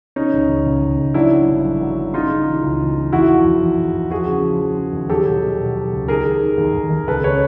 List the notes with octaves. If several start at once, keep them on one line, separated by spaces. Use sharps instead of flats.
C#3 C#4 D#4
C#2
C#2
C#2
C#2
C#2
F#3 D4 E4
F#3
G1
F#3
F#3
F#3
C#3 D#4 F4
C#3
E3
C#2
E3
E3
E2 E4 F#4
F3
E2
E2
E2
E2
F3 F#4 G#4
C#3
F3
F3
C#3
D#2
F#3 G4 A4
B2
B2
B2
F#3
C#2
D#3 G#4 A#4
D#3
D#3
D#2
D#2
D#2
C#2 A4 B4
C#3 B4 C#5